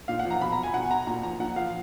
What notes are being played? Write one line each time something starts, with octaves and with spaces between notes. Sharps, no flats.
A#2 F5
F#5
F3
A#5
B2 B5
A#5
G#5
B2 F#5
A#5
A#2 A#5
F3 A#5
A#2 F#5
F3 F5